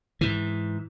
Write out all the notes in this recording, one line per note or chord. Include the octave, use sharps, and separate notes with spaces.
G#2 E3